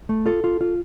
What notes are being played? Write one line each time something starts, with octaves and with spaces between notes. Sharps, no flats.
A3
F4 A4
F4
F4